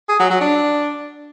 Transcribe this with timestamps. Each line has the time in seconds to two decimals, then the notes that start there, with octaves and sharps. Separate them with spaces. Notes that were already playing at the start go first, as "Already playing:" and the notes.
0.09 G#4
0.19 F#3
0.30 F#3
0.41 D4